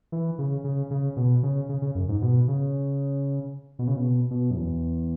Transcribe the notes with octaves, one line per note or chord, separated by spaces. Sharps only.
E3
C#3
C#3
C#3
B2
C#3
C#3
C#3
F#2
G#2
B2
C#3
B2
C#3
B2
B2
F#2
E2